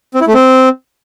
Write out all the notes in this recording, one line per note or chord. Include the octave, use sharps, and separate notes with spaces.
C4
E4
A3
C4